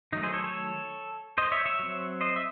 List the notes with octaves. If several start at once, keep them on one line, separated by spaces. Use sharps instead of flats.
D#3 F#3 A3 D#4
G#4 C5
A4 C#5
A4 C#5
C5 D#5
C#5 E5
C#5 E5
F#3 C4
C5 D#5
E5